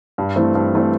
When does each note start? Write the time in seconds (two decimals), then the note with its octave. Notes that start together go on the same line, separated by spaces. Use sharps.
0.18 G2
0.36 E3 A3 C4
0.55 G2
0.73 E3 A3 C4